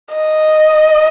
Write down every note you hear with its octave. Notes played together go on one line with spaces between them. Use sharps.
D#5